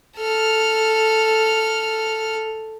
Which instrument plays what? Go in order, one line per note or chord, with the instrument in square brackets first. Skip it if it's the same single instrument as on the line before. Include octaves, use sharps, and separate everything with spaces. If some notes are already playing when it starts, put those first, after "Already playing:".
[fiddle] A4 F6